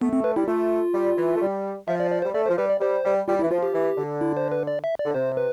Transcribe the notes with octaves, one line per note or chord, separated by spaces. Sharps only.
A3 B3
C4
B4
G3 E4
A3 F4
G3
E3
A3
G3
F3 E5
D5
D5
G3 C5
A3 D5
F3 C5
G3 B4
D5
G3 C5
G3
G3 F4
E3 E4
F3 F4
G4
E3
D3
E4
C5
B4
D5
E5
D5
D3
C3 C5
B4